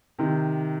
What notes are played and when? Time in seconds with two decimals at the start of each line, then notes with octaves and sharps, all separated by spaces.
0.19 C3 D#3